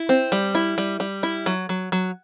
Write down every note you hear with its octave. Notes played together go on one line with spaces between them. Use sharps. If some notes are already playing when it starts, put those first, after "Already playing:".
Already playing: E4
C4
G3
E4
G3
G3
E4
F#3
F#3
F#3